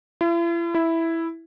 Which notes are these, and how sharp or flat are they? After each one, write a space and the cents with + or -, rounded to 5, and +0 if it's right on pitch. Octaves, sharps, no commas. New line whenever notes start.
E4 +45
E4 +0